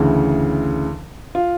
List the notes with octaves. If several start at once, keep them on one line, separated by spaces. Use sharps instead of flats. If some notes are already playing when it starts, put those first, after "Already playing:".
Already playing: D2 C#3 E3
F4